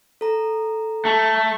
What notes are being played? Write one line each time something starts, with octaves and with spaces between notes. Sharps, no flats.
A4 A#5
A3